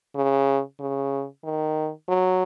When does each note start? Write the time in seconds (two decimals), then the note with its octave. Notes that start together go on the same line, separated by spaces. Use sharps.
0.15 C#3
0.80 C#3
1.44 D#3
2.09 F#3